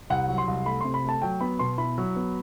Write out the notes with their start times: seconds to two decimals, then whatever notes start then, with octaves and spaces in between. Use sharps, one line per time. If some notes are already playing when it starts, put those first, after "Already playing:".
0.10 C2 F#5
0.28 F#3
0.38 C6
0.48 C2
0.66 A3 B5
0.81 C3 C6
0.94 B5
1.04 A3 A5
1.22 F#3 G5
1.40 B3 B5
1.59 B2 C6
1.78 E4 B5
1.98 F#3
2.16 B3